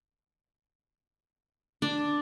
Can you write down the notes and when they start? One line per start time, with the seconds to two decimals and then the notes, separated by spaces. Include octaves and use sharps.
1.82 D4